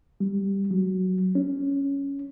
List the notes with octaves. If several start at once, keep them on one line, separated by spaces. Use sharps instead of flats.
G3
F#3
C#4